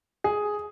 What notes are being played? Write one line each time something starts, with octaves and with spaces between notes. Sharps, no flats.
G#4